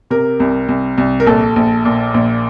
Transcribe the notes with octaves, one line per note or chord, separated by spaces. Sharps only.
C3 A#4
C2
C2
C2
A#4
A#1 A4
A#1
A#2
A#1